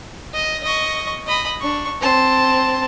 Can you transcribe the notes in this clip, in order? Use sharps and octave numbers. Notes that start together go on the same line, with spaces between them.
D#5
D#5 C#6
D#5 B5
D4 C#6
C4 A5